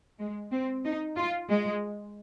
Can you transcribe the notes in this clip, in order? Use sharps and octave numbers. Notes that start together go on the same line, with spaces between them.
G#3
C4
D#4
F4
G#3